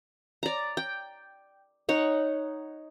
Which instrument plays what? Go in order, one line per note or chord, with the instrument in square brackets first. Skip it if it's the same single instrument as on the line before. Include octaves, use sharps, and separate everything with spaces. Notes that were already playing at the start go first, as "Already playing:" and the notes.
[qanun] D5 A#5
G5
D#4 C#5 F#5